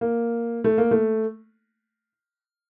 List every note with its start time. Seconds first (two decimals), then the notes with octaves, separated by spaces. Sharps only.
0.01 A#3
0.64 A3
0.78 A#3
0.91 A3